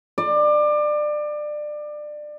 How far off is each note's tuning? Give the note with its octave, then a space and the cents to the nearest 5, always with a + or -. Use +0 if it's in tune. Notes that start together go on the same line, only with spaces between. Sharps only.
D5 +25